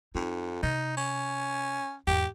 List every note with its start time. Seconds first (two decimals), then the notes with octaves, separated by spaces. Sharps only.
0.15 F2 D#4
0.63 C3 D#4
0.97 C#4
2.07 E2 G#2 G4